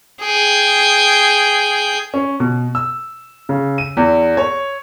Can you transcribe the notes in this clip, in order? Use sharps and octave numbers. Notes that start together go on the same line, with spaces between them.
G#4 G5
C#4
B2
E6
C#3
D#7
E2
C#5